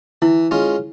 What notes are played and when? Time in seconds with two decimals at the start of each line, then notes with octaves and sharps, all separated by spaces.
0.22 E3 E4
0.51 G#3 C#4 F4